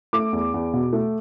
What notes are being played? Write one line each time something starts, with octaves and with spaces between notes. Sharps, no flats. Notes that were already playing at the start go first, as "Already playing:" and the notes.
A3 D6
E2
E2
B2
A3